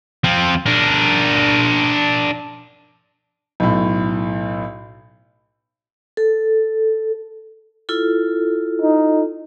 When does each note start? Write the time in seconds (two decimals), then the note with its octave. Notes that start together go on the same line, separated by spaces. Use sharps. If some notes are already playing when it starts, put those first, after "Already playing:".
0.24 F3 C4
0.66 D4 A#4
3.60 B1 A2
6.17 A4
7.89 E4 F4 A4
8.82 D#4